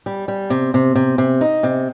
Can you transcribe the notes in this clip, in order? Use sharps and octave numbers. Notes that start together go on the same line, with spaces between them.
G3
G3
C3
C3
C3
C3
D#4
C3